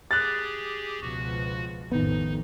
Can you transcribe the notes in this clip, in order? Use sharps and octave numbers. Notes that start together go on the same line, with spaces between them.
G4 G#4 F#6 A6
C#2 B2 F3 F#4
A1 F2 D#3 B3 D#4